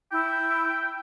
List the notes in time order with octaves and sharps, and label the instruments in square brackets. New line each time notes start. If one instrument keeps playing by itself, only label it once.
[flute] E4 [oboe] G5